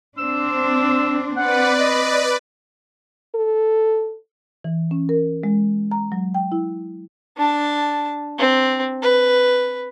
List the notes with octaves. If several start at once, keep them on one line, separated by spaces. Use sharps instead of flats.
C4 D4 C5 E6
C4 B4 D5 F#5
D#5
A4
E3
C#4
A#4
G#3
A#5
F#3
G5
E4
D4 A5
C4
B4